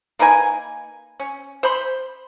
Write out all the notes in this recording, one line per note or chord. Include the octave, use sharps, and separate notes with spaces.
A#3 D#4 B4 G#5
C#4
C5 B5 C6